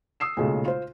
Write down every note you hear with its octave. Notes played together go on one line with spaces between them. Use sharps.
D#6 E6 C7 E7
B1 A#2 C#3 G#3 A3
F4 C5